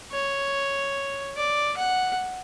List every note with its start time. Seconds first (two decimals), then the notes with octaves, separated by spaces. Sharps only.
0.12 C#5
1.36 D5
1.77 F#5